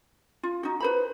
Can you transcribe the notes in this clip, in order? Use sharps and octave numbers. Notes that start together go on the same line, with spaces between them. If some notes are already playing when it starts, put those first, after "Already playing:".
F4
D#4 F#4
B4 C5 B5